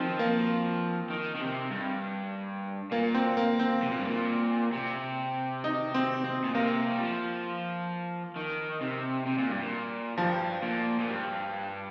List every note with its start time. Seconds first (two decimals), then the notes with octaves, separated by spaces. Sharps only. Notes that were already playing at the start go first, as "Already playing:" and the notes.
Already playing: D#3 F3 C4
0.19 A#3
1.10 D#3
1.36 D#3
1.41 C3
1.71 G2
2.91 A#2 A#3
3.14 C4
3.37 A#3
3.60 C4
3.83 C3
3.91 A#2
3.99 G2
4.07 A#2
4.73 C3
5.64 D#4
5.94 C4
6.24 C4
6.44 A#2
6.54 C3 A#3
6.91 G3
7.00 F3
8.36 D#3
8.81 C3
9.27 C3
9.38 A#2
9.49 G2
9.61 A#2
10.18 G2 F3
10.63 A#2
11.00 A#2
11.08 G2